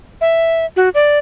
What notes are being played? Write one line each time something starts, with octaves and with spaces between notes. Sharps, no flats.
E5
F#4
D5